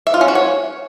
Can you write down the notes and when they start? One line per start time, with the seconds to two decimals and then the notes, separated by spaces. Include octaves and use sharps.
0.07 E5
0.14 F4
0.21 C#4
0.28 F#4
0.35 C#5